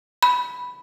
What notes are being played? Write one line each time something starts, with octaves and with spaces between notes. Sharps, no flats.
B5